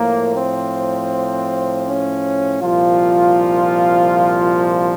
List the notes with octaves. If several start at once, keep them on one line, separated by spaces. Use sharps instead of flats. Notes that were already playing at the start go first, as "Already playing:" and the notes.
Already playing: A2 F3 A#3
C4
C#4
C2 A#2 F3 F4